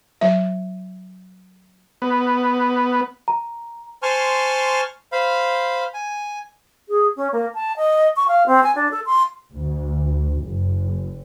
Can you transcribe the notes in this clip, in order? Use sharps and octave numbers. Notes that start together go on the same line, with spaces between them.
F#3 E5
B3
A#5
C5 G#5 A5 C6 C#6 F6
C5 F5 B5
G#5
G#4
C#4
A#3
A5
D#5
C#6
F5
C4
G#5
D4
A4
C6
D2
F#1